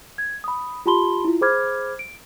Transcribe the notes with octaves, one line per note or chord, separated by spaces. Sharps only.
G#6
B5 D#6
F4 G4 A5 B5 C6 G7
E4 F4
G#4 C5 B5 D6 F6 G#6
D7